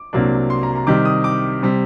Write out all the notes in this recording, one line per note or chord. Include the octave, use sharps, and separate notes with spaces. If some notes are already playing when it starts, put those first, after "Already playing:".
Already playing: D6
C2 C3 F#3 A#3 D4
C6
A#5
A#5
C3 D#3 G3 D6
D#6
D6
C3 G3